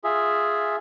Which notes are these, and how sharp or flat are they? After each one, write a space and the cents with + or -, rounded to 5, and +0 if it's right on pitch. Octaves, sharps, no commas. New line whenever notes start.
F4 +0 G#4 +0 E5 +0